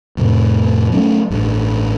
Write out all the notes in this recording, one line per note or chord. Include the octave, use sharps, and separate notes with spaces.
F2 A2 C3
F#3 G3 A3 C#4
A1 G2